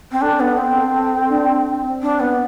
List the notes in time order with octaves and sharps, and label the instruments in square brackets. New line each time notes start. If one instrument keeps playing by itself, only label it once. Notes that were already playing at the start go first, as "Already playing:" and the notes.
[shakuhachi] C4
[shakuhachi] D4 [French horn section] A4
[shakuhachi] B3
C4
[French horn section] A4
D4
C4
[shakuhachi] D4
B3